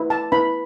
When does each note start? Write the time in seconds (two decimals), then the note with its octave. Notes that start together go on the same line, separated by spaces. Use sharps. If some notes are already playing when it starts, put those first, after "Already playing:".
Already playing: E4 B4
0.10 A5
0.32 E4 B4 B5